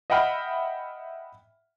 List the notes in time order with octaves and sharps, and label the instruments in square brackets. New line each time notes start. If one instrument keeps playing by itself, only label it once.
[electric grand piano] D#5 E5 F#5 G5 B5 F6